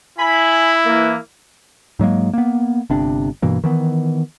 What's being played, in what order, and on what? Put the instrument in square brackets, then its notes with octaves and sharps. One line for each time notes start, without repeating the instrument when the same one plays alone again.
[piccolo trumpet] E4 [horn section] G#5 B5
[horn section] E3 A#3
[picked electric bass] G#2 F#3 G#3 A#3
A#3 B3
G1 C3 D4
G2 B2 E3 A#3
D#3 E3 B3